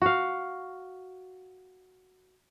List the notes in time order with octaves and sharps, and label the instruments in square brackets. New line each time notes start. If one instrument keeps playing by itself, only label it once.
[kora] F#4 F5